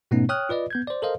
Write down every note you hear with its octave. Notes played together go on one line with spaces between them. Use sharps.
G#2 B2 A3 B3 C#4 D#4
C#5 G5 D#6 F6 F#6
F4 B4 D5 D#5
B3 G6 G#6
C5 D5
A4 A#4 C5 D#5 F5